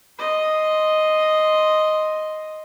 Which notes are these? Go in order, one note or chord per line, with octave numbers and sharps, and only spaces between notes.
D#5 C6